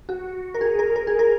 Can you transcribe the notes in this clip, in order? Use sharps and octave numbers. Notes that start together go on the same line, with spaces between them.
F#4
A#4
G#4
A#4
A#4
G#4
A#4